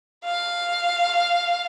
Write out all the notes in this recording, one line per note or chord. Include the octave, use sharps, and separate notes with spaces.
F5